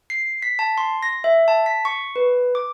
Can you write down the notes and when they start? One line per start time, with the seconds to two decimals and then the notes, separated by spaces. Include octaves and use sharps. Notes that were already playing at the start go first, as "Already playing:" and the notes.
0.10 C7
0.42 B6
0.59 A5
0.78 C6
1.03 A#6
1.24 E5
1.48 A5
1.66 B6
1.85 C#6
2.16 B4
2.55 D6